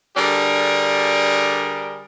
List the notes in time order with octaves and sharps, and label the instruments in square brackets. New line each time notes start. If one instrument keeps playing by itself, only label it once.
[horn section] D3 G3 D4 G#4 A#4